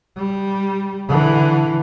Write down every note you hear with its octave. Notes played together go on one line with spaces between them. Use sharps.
G3
D3 E3